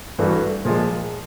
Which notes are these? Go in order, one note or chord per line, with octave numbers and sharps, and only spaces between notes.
G2 E3 A3 D4 F#4
A#2 F3 G#3